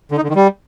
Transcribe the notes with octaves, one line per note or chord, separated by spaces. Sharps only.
D3
D#4
D3
D#3
G3